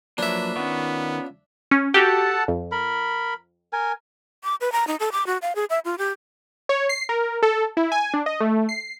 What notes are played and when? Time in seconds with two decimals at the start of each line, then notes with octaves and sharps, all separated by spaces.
0.18 F3 F#3 A#3 D4 B4 E5
0.56 D#3 B3 C#4 F4 C#6
1.71 C#4
1.94 F#4 G4 A4 F#5 A5
2.48 F2
2.72 A#4 B5
3.73 A#4 G#5
4.44 D6
4.61 B4
4.72 A#5
4.87 D#4
5.00 A4
5.12 D6
5.27 F#4
5.42 F5
5.55 G#4
5.70 E5
5.85 F4
5.98 G4
6.69 C#5
6.89 C7
7.09 A#4
7.42 A4
7.77 E4
7.92 G#5
8.14 D4
8.26 D#5
8.40 A3
8.69 C7